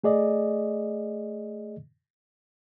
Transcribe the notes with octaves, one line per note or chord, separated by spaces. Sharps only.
A3 G#4 D5 D#5